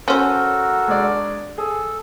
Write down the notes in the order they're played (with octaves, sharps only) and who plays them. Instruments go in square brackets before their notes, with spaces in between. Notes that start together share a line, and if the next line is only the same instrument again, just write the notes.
[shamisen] C#4 C5 [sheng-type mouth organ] F#4 A4 A#4
[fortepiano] G#3 D4 D5
[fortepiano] G#4 [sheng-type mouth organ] A4